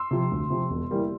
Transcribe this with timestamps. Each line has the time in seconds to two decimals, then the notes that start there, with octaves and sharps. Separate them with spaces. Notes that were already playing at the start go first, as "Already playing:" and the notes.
Already playing: C6 E6
0.11 C3 F3
0.31 D2
0.50 C3 F3
0.71 E1
0.91 E3 G3 A#3